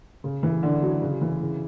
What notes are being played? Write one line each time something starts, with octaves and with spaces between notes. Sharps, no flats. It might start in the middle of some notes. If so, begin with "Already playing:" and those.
C#3
E3
D3
F#3
C#3
E3
C#3